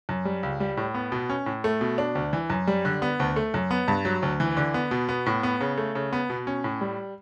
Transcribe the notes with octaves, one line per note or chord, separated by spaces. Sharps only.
F#2
G3
C#2
G3
A2
B3
B2
C#4
A2
A3
B2
D4
D2
E3
F#2
G3
D3
B3
D2
A3
F#2
B3
G2
F#3
D2
E3
D3
B3
B2
B3
A2
B3
C#3
A3
C#3
B3
B2
C#4
A2
G3